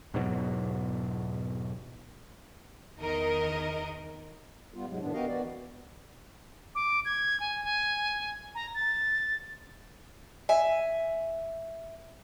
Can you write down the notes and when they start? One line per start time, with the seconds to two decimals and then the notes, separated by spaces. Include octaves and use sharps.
0.14 E2 G#2 B2 F#3
2.98 E2 D#3 A#4 D#5
4.74 G3 B3 F4
4.88 G#2 C3 F#3 G#3
5.01 F#2 A2 D#3 B3 D4
5.13 B3 F#4 G4 A#4 D#5 F5
5.28 E3 B3 F#4 D5
6.75 D6
7.05 G#6
7.40 G#5
7.64 G#5
8.55 A#5
8.74 A6
10.49 E5 G#5